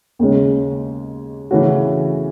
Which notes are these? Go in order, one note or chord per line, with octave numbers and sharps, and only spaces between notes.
D#2 C#3 G#3 C#4
C#3 E3 A3 C#4 F#4